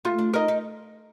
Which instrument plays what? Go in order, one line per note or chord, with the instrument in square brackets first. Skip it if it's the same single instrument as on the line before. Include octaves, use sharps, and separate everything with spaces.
[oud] A3 [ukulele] F4
[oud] D4
[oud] D#4 [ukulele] A#4 D#5
[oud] D#4